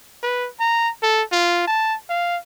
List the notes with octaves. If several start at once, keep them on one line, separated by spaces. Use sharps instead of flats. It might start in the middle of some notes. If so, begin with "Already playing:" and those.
B4
A#5
A4
F4
A5
F5